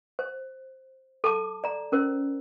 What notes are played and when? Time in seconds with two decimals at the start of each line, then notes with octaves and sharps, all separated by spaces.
0.19 C5
1.24 A4 A5 D6
1.64 D5 A#5
1.92 C#4 A#4 C5